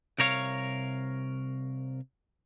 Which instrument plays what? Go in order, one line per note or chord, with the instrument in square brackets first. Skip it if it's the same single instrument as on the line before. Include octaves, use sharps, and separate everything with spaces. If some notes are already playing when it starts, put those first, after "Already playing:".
[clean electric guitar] C2 C3 A#4 C#5 F5